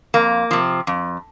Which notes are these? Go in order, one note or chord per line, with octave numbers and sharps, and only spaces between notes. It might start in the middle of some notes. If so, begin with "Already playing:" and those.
F2 A#3
C3 F3
F2